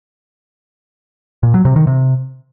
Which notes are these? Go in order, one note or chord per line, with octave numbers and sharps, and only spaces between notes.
A#2
F#3
C3
D#3
C3